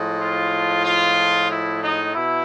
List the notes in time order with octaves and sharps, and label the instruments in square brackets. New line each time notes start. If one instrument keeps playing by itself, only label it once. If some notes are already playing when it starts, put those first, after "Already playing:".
Already playing: [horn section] A2 F3 G#3
F4
F4
E4
D#4
B2 E4